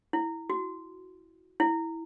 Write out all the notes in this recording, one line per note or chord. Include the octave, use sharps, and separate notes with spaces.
E4
F#4
E4